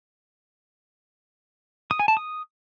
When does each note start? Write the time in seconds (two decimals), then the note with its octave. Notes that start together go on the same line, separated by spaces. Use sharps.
1.91 D#6
1.99 G#5
2.08 A5
2.17 D#6